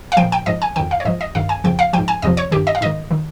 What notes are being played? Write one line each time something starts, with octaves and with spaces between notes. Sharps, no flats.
F5
A#2 F3 G5
G5
G#2 F3 D#5
G#5
F2 D#3 G5
F5
C#5
G#2 F3 D#5
D#5
G2 D#3 F5
G#5
F2 C#3 F3 G5
F5
G#2 F3 G5
G#5
F2 C3 F3 D#5
C#5
G2 D#3 G4
D#5
F5
G#2 D#3 D#5
D#3